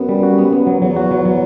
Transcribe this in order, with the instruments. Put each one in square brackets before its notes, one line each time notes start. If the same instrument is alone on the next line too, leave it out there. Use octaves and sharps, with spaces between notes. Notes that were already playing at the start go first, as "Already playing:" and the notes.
Already playing: [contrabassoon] F#2 [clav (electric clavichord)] B3
[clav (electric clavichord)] G3
F#4
B3
B3
F#3
[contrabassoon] E2 [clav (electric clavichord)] F#3
[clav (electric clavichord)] F#4
F#3
F#3